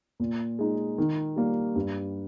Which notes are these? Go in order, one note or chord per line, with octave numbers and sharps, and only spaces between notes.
A#2
G#3 D#4
D#3
G3 A#3
G2